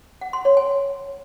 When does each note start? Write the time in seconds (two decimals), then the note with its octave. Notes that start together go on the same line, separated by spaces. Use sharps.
0.21 F#5
0.33 C6
0.45 C#5
0.57 G#5